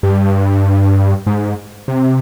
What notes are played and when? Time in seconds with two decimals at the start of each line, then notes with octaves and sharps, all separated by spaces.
0.03 G2
1.27 G#2
1.88 C3